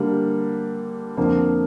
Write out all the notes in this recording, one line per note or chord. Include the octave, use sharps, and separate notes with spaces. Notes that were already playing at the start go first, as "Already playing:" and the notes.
Already playing: D3 G3 A#3
F2 D3 F3 A#3